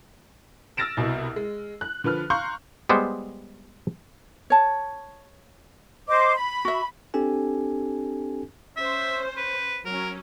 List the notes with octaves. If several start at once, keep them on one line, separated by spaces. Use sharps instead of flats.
E6 F6 A6 A#6 D7 E7
C2 B2 E4
G#3
F#6
D3 F3 B4 F6
F5 A#5 C6 C#6 F#6 G6
G3 G#3 B3 C5
C#5 A5
C5 D#5 D6
B5
F#4 E5
C4 D4 G4 A4 G#5
C#4 C5 E5
B4
F#3 C#4 A#4